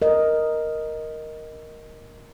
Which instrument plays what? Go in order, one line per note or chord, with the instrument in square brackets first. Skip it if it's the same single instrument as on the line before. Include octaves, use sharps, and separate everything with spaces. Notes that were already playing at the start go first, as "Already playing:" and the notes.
[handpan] A#4 D#5